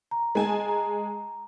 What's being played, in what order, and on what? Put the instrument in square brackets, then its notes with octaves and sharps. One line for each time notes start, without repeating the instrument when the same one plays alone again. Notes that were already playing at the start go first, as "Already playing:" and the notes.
[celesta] A#5
[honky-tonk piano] G#3 G#5 A5
[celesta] A#5